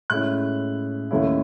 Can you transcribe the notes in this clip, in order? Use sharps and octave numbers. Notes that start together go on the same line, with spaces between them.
A2 G#3 C#4 E4 F#6
D#2 D#3 A3 C#4 E4